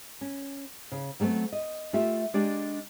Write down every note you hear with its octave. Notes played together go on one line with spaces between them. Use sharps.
C#4
C#3
F#3 G3 A3 B3 C4
D#5
A3 F4 G4 E5
G#3 D4 G4 D5